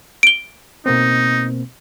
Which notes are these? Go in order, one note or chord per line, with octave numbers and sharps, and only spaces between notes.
D7 G7
B2 A#3 C4 D#4